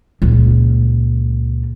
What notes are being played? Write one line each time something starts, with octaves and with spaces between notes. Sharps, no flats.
C#2 A#2